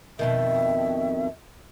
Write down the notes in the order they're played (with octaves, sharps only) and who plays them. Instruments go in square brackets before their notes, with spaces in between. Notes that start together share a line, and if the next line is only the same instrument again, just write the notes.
[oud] F2 B2 D#3 [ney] E5